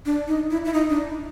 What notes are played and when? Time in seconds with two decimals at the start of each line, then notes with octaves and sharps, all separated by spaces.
0.06 D4
0.28 D#4
0.51 E4
0.65 E4
0.74 D#4
0.89 D4